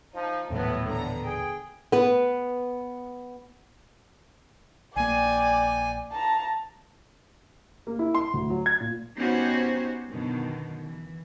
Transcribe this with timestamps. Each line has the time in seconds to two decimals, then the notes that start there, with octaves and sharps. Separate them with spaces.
0.15 F3 D#4
0.50 D#1 A1 A2 F#3 A3 B3
0.89 D3 B3 A#5
1.25 G#4 G5
1.92 B3 B4
4.96 A#1 A#3 D5 G5 G#5
6.12 A5 A#5
7.87 A#3
7.99 E4
8.15 C6
8.34 D2
8.50 F#3
8.66 G#6
8.80 A#2
9.17 B3 C#4 D#4 F#4 G4 C5
10.09 F#2 B2 D3 D#3
10.82 E3